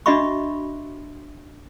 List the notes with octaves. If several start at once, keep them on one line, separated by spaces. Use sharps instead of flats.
D4 F#4 D#5 E5 B5 C#6